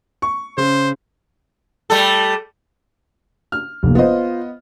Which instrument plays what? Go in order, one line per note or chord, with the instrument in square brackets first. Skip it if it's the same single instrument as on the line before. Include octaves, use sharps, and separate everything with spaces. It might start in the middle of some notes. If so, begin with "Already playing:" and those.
[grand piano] C#6
[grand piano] C#3 [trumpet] C5
[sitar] G3 A3 A4
[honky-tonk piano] F6
[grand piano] F1 A#3
[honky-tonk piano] B3 D#5 [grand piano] F4 C5